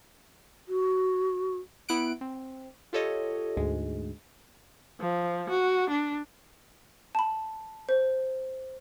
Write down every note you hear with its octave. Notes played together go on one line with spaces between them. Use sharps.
F#4
B3 E4 F#5 F#6 D7
C4
F4 G4 A4 C#5 D#5
D2 G#2 G#3
F3
F#4
D4
A5 B5
C5